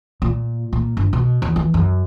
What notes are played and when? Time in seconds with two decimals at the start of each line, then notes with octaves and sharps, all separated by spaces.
0.22 A#2
0.73 A#2
0.97 G1
1.13 B2
1.42 E2
1.56 E3
1.74 F#2